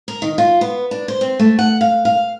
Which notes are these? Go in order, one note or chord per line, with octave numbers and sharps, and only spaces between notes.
A#4
D#3
F4
B3
D4
C5
C4
A3
F#5
F5
F5